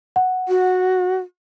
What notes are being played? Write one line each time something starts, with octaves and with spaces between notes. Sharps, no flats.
F#5
F#4